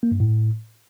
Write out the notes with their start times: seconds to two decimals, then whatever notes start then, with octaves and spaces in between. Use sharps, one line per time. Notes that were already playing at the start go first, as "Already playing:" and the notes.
0.03 A#3
0.12 G2
0.20 A2